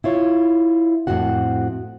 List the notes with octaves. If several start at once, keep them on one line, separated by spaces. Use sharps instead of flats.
E4 F4 C#5
F2 A2 G#3 C4 F#4 F#5